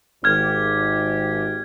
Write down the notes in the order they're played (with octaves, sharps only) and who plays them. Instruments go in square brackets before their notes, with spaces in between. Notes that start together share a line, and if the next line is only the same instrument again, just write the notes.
[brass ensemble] G#1 G4 [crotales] F6 G#6